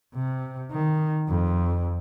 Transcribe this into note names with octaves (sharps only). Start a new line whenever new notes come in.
C3
D#3
F2